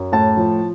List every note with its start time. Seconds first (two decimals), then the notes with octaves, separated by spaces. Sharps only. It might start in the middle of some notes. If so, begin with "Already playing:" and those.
Already playing: F#2
0.12 A2 A5
0.37 F3